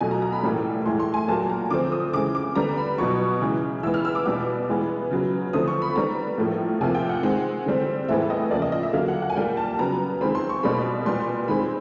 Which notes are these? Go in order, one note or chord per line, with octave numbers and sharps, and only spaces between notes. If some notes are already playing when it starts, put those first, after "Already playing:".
B2 F#3 A3 G#5
A#5
A#5
B5
A2 E3 G3 A#3
A2 E3 G#3 C6
C6
G#5
A#2 F#3 A#3 A5
A#5
D3 F3 A3 C4 D6
D#6
C#3 E3 G#3 D6
D6
D3 G3 B3 A#5
B5
B2 F#3 B3 C#6
C#3 E3 G#3
E3 G#3 B3 E6
F6
E6
D6
B2 G3 B3 D6
E3 G#3 B3
C#3 F#3 B3
D3 F3 A3 C4 D#6
C#6
B5
D#3 G3 B3 A#5
A2 F3 A#3
C3 F3 A#3 G#5
G5
F#5
D#3 G#3 C4
D3 G3 C4
A2 E3 G#3 B3 E5
D#5
C#3 F3 A#3 D5
D#5
D#5
E5
D3 F#3 A#3 F5
F#5
F#5
G#5
A#2 G3 A#3 G5
A5
C#3 F#3 B3 A#5
D#3 G#3 C4 B5
C6
C#6
B2 G3 A#3 B5
A#2 G3 B3 C6
D#3 G#3 C4 B5